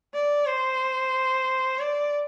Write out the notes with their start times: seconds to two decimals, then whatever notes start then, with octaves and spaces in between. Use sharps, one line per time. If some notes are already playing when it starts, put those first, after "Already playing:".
0.14 D5
0.46 C5
1.79 D5